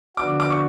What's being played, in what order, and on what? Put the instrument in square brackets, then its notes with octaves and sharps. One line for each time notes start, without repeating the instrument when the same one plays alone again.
[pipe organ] D3 F3 B3 D4 F#4 [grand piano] D6
[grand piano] D6
C#6